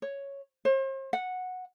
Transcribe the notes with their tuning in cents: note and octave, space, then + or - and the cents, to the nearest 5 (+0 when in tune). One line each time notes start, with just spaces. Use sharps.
C#5 +0
C5 +40
F#5 -10